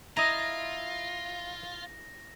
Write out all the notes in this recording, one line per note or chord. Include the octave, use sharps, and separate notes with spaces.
E4 F4 D#5 A#5 A#6